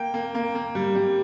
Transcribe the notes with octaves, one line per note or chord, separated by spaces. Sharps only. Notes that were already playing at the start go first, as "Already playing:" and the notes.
Already playing: A#3 G5
A#3
A#3
A#3
G3
G3